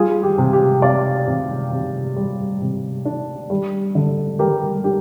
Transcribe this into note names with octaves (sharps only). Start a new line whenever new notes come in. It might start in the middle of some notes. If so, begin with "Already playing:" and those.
Already playing: G3 F4 G#4
G4
C3
G4
C3 D5 F5
C3
C3
G3
C3
D4
G3
D3
G3 G4 A#4
D4 G4